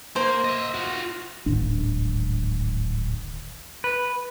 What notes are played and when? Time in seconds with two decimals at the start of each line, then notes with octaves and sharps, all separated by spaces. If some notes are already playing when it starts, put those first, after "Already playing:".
0.16 A#3 C5
0.45 D#5 E5
0.75 F4 F#4
1.46 D1 G#1 D4
3.84 B4